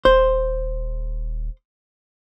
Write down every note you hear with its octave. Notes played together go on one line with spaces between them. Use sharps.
D#1 C5